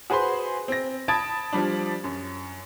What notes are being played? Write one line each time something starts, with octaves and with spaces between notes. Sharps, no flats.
F#4 G#4 B4 C5 C6
C4 A#6
A5 B5 D#6 G#6 A6 D7
F3 G3 D4
F#2